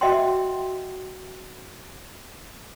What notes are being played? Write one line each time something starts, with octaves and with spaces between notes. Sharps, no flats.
F#4 D#5 E5 F#5 G5 C6